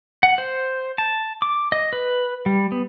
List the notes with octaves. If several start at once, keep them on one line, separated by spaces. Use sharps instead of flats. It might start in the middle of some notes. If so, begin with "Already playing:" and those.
F#5
C5
A5
D6
D#5
B4
G3
B3